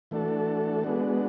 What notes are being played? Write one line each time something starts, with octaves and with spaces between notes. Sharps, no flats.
E3 A3 D4 F#4 A4
G#3 B3 D4 F#4